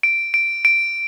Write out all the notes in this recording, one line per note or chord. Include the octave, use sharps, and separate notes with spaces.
D7
D7
D7